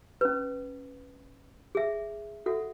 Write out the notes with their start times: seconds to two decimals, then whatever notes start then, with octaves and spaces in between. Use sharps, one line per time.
0.21 C#4 B4
1.75 G#4 E5
2.46 F#4 A4 E5 F#5